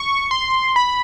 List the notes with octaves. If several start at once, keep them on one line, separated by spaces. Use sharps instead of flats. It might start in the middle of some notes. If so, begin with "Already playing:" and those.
Already playing: C#6
C6
B5